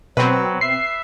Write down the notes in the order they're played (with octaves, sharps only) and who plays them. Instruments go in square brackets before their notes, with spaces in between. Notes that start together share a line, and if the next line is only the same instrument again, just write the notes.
[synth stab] B2 C4 [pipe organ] F#3 [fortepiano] B4
[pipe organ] E5 [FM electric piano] C7